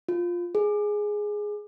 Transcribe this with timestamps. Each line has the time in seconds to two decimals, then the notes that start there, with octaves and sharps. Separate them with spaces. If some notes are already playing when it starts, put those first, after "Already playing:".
0.08 F4
0.55 G#4